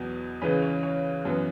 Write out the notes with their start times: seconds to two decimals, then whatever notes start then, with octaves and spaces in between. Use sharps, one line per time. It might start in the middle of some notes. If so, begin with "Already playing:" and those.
Already playing: E2 B2 F#3 B3
0.41 C#2 C#3 E3 C#4 B4
0.62 C#5
0.83 C#5
1.25 F#2 E3 B3